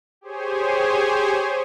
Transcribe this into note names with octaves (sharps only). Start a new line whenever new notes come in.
G4 G#4 C5 C#5 G#5